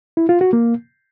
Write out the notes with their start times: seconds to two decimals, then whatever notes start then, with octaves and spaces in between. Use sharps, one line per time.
0.17 E4
0.29 F4
0.41 F#4
0.53 A#3